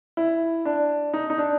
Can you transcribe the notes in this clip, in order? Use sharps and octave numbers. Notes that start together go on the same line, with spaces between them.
E4
D4
D#4
D#4
D4